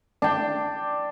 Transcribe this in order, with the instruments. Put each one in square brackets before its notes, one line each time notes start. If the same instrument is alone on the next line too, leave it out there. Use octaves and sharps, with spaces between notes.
[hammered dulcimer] D4 G5